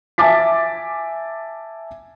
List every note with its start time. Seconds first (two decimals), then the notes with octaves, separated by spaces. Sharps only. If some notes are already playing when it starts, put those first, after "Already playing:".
0.18 E5 G#5 A5 D6 A6 B6